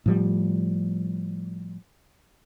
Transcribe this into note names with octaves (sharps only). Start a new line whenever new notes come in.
A2 F3 G3